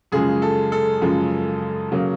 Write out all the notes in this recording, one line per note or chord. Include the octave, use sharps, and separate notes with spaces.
F#2 C#3 F3 G#3 G#4
A4
A4
F#2 C#3 F3 G#3
C#3 F#3 A#3